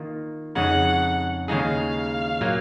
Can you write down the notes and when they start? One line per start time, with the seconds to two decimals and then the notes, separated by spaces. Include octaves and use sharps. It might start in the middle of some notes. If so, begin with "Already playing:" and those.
Already playing: D#3 A#3 F4
0.55 F2 C#3 G#3 D#4 F#5
1.48 D#2 C#3 G#3 D#4 G#4 F5
2.41 A#2 F#3 A#3